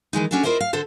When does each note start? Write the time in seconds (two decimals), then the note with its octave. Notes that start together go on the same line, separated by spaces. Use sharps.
0.13 D#3 E3 G#3 D#4
0.31 C#4 D4 F#4 G#4 A4
0.43 E4 F4 A#4 C5 D#5 E5
0.60 F5
0.73 D3 A4 C5